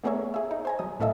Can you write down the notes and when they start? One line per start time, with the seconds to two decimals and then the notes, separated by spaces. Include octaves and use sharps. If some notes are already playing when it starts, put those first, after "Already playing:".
0.04 A3 B3 G#4 A#4 C#5 E5
0.34 G#4 E5
0.51 D#4
0.65 C5 G#5 A#5
0.79 F#3 D#6
1.00 A2 C#4 A4 D#5 E5